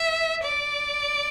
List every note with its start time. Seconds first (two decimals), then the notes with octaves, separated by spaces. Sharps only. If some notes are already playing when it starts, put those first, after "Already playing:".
Already playing: E5
0.44 D5